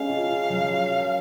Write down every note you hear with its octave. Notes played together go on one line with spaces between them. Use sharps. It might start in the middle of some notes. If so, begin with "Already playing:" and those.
Already playing: G#3 C#4 F5
F4
F4
F#3
F#4
A#4